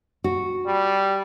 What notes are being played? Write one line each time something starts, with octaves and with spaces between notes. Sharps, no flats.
F#4
G3